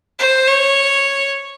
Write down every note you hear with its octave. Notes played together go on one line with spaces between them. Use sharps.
C5
C#5